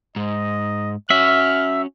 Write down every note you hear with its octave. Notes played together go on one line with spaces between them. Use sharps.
G#2 D#5
C#4 F#4 E5 F6